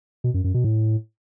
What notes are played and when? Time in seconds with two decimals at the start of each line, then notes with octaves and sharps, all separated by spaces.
0.24 B2
0.34 F#2
0.44 F#2
0.54 B2
0.64 A2